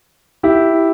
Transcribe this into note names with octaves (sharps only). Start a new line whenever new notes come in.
E4 G4